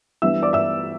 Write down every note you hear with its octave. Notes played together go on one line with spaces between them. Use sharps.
E3 G3 B3 D4 E5 E6
D5 D6
E5 E6